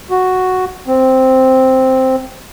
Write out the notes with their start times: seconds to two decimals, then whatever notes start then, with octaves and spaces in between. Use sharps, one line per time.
0.11 F#4
0.87 C4